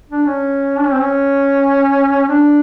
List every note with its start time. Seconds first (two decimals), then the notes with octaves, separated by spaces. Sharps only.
0.10 D4
0.26 C#4
0.77 D4
0.85 C#4
0.92 C4
1.00 C#4
2.28 D4